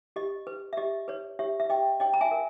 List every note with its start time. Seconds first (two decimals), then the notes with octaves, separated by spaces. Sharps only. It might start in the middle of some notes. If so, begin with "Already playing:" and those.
0.16 G4 D#5
0.47 B4
0.73 E5
0.77 G4 D#5
1.08 B4 C#5
1.39 G4 C#5 E5
1.60 E5
1.70 G4 D#5 G5
2.00 C#5 D#5 G5
2.14 A#5
2.21 E5 G#5
2.31 A#4